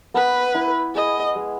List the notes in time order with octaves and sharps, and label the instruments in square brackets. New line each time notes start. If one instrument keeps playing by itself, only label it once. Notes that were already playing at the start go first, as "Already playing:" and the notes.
[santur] B3 [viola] B4
[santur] E4
[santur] G#4 [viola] D#5
[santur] G#3